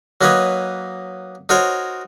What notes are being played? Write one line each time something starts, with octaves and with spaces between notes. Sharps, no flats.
F#3 A#3 D#4 B4 C#5 D#5
D#4 F#4 A#4 C5 C#5